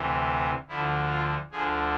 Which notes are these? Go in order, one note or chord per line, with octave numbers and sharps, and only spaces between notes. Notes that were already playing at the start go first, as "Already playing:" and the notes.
Already playing: D2 C3 E3
D2 D3 F3 E4
F4
D2 D3 F3 G#4